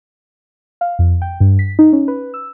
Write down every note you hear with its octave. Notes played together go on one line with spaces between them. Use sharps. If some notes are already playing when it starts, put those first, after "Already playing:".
F5
F2
G5
G2
B6
D#4
C#4
B4
E6